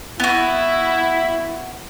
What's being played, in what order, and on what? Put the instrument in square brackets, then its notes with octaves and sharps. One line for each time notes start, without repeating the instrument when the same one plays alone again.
[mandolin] B3 F#4 [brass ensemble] E4